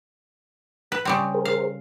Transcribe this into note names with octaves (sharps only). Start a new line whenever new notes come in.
B4
C#3 G3 C4
G#4 A#4 C5
F5